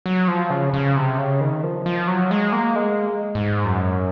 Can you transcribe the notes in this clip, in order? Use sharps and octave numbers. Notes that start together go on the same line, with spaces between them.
F#3
F3
C#3
C#3
C3
C#3
D#3
F3
F3
F#3
G#3
A#3
G#3
G#2
F#2